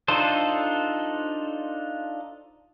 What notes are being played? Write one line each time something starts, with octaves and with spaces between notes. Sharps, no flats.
D4 D#4 F4 A4 C5